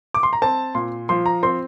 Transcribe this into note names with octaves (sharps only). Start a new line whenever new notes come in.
D6
C6
A#5
C4 A5
A#2 C6
F3 C6
A#5
C4 C6